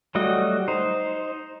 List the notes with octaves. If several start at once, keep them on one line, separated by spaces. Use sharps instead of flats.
F#3 G3 A3 F#4 D#5
D#4 C5